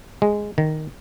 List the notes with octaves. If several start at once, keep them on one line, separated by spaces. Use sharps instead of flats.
G#3
D#3